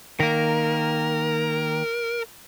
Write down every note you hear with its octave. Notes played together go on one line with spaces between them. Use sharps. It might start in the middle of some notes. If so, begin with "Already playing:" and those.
D#3 A#3 A#4